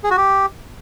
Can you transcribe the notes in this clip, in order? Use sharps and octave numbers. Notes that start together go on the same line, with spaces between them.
G#4
F#4
G4